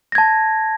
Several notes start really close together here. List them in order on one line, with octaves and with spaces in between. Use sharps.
A#6 G#6 A5